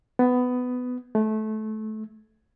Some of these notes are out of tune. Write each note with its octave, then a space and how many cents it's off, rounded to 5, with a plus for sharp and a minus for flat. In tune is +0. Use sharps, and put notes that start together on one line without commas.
B3 +15
A3 -20